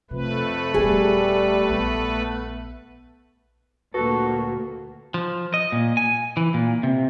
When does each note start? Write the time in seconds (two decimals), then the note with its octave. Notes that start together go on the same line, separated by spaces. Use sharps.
0.11 F2 C3 A3 B4
0.74 D#1 G3 B3 G#4
1.70 A#1 B3
3.94 D2 A#2 A#3 F#4 A4 B4
5.14 F3
5.54 D#5
5.72 A#2
5.97 G#5
6.37 E3
6.54 A#2
6.83 C3